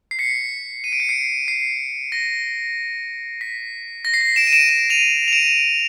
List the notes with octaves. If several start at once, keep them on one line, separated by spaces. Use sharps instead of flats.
C7
B6 C#7
D#7
D7
C#7
C7 D7
C7
A#6
B6
A#6
C7
B6
D7 E7
D#7
D7 E7
D7 E7
D#7 F7
F7
D7 E7